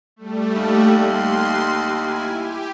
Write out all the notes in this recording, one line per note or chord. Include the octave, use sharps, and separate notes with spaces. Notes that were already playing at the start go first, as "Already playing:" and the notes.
G3 A3
D#2
C6
E4 G#5
G4